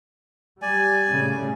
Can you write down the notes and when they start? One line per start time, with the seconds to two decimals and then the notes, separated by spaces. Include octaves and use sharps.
0.62 G3 D5 G#5
1.08 A2 C#3 A3